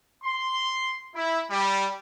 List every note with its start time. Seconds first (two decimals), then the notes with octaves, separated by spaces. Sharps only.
0.24 C6
1.15 E4
1.50 G3